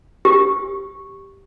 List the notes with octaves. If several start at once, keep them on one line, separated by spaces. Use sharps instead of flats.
G4